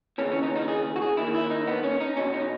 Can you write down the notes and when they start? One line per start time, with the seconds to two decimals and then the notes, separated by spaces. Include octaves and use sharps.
0.18 D#2 C#3 E3 C#4
0.31 C#4
0.43 D#4
0.56 D#4
0.68 G#4
0.96 F#4
1.02 G#4
1.17 D#2 D#3 E4
1.35 E4
1.50 D#4
1.68 B3
1.84 C#4
2.00 D#4
2.17 E2 B2 C#4
2.34 D#4